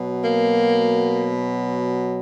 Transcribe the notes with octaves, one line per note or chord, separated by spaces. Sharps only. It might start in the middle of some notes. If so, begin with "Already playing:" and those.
Already playing: B2 F#3
A#3